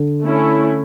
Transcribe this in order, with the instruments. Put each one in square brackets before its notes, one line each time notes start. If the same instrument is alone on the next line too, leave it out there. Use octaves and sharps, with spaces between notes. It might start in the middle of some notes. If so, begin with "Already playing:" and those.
Already playing: [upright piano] D3
[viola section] A3 C#4 E4